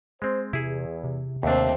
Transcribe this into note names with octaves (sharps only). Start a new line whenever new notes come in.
G#3 C4 C5
E2 C3 E4 G#4
C3
D#2 A3 C4 D4 E5 G5